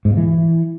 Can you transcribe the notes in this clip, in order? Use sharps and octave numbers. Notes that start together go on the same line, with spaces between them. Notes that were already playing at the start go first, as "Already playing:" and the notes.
G#2
A#2
E3